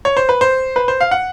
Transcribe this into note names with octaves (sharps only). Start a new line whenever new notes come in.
C#5
C5
B4
C5
B4
C5
F5
F#5